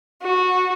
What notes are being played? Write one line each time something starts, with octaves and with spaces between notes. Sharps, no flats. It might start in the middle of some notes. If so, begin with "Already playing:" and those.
F#4